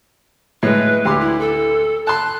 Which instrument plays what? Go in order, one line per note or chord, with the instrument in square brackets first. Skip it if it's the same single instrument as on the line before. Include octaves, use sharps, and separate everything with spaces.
[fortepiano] A2 G#3 [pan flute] B4
[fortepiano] D2 B4 C6 [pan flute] G4
[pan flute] E4
A4
[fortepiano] A5 C6 [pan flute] F#6